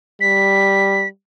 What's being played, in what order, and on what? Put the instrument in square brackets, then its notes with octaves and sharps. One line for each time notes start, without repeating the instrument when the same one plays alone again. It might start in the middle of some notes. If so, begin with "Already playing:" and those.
[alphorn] G3 [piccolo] B6